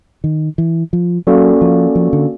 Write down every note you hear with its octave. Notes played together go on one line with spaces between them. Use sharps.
D#3
E3
F3
F#3 A#3 C#4 F#4 A4 D5
F3
F3
D3